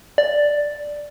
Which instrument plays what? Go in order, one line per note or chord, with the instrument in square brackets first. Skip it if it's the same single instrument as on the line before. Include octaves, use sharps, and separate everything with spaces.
[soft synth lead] D5